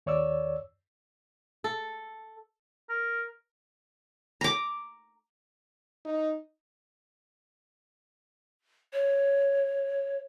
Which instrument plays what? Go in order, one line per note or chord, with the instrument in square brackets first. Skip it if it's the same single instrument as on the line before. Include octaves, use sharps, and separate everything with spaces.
[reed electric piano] D#2 C#5 D5 E6
[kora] A4
[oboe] A#4
[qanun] A#5 D6
[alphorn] D#4
[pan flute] C#5